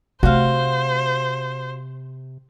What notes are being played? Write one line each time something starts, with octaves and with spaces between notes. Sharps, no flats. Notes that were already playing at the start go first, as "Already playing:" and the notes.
C3 A3 F#4 C5 F5